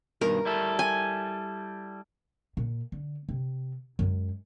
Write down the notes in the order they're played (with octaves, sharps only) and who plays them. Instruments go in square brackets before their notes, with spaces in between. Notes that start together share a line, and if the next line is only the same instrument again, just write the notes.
[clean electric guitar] G2 B2 D#3 [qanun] A#4
[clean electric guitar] G3 E4 A4
[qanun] G#5
[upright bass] A#2
D3
C3
F#2 G#3